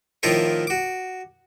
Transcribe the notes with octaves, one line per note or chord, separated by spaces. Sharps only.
A2 D#3 F3 E4 F4 A#4
F#4 D6